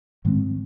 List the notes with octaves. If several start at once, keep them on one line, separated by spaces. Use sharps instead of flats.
G#2 D#3 G#3 C4